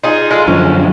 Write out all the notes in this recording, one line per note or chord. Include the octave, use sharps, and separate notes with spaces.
D#4 F4 G#4
G#3 F4 A4
F#2 D3 F3 C#4